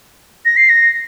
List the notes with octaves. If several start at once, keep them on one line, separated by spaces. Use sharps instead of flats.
A#6
C7
A#6